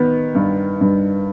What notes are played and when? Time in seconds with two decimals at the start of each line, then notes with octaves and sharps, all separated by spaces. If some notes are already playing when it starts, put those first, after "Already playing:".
Already playing: D#3 B3
0.35 G2
0.81 G2